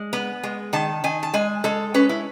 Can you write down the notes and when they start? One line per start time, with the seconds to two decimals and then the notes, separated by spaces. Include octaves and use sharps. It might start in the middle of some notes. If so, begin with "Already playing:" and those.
Already playing: G#3
0.13 B3
0.44 G#3
0.73 D#3 A5
1.04 D#3 G#5
1.23 A5
1.34 G#3 G#5
1.64 G#3 A4
1.94 C#4 B4
2.09 E4